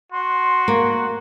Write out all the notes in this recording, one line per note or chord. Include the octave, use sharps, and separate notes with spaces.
F#4 C6
A#3